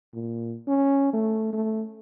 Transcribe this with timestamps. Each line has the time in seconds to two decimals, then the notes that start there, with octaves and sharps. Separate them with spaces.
0.14 A#2
0.67 C#4
1.13 A3
1.53 A3